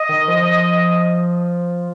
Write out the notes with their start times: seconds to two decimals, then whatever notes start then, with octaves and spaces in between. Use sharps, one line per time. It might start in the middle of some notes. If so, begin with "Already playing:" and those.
Already playing: D#5
0.09 D#3
0.28 F3